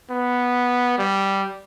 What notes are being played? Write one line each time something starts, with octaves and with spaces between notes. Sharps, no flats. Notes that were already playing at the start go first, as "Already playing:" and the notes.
B3
G3